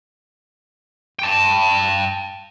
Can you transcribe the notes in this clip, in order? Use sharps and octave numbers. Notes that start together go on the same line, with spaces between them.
G5 A5